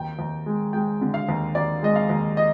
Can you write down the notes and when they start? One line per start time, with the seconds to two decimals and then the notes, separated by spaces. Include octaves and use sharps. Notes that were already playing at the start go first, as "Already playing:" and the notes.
Already playing: D#2 G5
0.19 D#2
0.46 G#3
0.73 G#3 G5
1.01 D3
1.14 F5
1.29 D#2
1.55 D#2 D5
1.82 G#3 D#5
1.96 F5
2.09 D#2
2.37 D#5